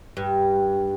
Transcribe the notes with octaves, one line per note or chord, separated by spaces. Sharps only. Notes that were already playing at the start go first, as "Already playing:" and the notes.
G2